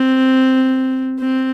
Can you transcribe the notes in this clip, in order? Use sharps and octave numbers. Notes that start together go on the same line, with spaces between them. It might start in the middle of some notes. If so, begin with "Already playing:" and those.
Already playing: C4
C4